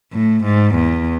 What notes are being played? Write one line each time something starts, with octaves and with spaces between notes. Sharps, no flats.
A2
G#2
E2